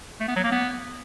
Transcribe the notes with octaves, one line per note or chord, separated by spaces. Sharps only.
A3
B3
F#3
A#3
B3